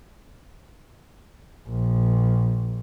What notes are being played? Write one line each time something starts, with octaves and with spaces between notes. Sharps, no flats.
A#1